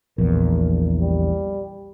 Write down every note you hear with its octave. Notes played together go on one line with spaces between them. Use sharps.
A#1 E2 A#4
G3